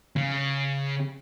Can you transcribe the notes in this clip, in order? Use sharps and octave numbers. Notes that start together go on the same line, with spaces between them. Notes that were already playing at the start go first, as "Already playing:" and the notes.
C#3